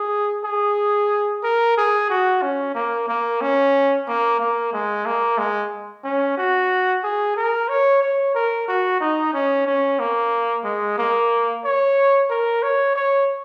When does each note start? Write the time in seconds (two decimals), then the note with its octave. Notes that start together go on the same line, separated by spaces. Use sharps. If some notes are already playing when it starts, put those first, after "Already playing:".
Already playing: G#4
0.44 G#4
1.43 A#4
1.77 G#4
2.09 F#4
2.42 C#4
2.75 A#3
3.08 A#3
3.41 C#4
4.08 A#3
4.40 A#3
4.73 G#3
5.06 A#3
5.38 G#3
6.04 C#4
6.37 F#4
7.04 G#4
7.37 A#4
7.69 C#5
8.02 C#5
8.35 A#4
8.68 F#4
9.00 D#4
9.34 C#4
9.67 C#4
9.99 A#3
10.64 G#3
10.98 A#3
11.64 C#5
12.30 A#4
12.62 C#5
12.95 C#5